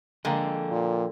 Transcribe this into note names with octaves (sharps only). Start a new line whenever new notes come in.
D3 F3 G#3 A#3 G5
A#2